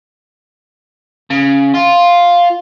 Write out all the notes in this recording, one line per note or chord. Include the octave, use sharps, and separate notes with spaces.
C#3
F4